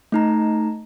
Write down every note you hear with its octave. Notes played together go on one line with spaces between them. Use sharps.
A3 D#4 A#5